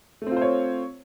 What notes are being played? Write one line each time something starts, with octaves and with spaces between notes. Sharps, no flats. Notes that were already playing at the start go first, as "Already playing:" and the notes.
A3 C4 F4 C5 C#5